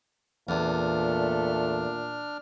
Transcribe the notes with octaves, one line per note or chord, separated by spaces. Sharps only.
E2 A#2 A3 D4 F6